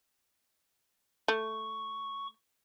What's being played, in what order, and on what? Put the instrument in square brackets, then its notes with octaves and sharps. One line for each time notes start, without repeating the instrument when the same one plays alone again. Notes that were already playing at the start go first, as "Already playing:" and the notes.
[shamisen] A3 [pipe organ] C#6